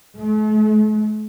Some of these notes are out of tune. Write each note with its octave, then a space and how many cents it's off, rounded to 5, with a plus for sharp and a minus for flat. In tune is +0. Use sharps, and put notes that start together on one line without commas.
A3 -45